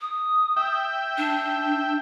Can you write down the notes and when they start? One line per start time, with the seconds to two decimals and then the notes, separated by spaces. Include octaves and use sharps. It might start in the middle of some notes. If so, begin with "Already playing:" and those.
0.01 D#6
0.57 E5 G5
1.18 D4